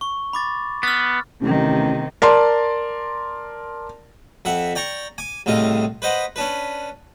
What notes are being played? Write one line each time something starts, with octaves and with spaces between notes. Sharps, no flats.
C#6
B5 D6 A6
B3 F6 A6
A1 C3 D#3
A#4 D5 A5 C6
F2 E5 F#5
D5 G5 A#5 C#6
G#5 D6
C2 A2 C#3 F4 D#5
B4 C5 D#5 F#5
C#4 D4 B4